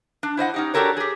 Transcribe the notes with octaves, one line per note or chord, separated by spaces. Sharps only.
D4
E4 C5 D#5 F#5
C#4 D#4 G4
D4 F#4 G4 A4 A#4 C#5
G4 G#4